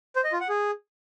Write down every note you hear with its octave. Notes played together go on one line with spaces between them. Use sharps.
C5
D#5
F4
F#5
G#4